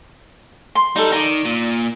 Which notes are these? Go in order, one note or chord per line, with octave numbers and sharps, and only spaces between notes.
C6
G3 D#4 A4
D#3 D5 A#5
A#2